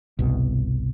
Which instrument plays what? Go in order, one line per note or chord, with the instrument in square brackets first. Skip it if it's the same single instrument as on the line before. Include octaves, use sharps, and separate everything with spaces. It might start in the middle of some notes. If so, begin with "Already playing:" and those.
[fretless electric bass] G1 C2 B2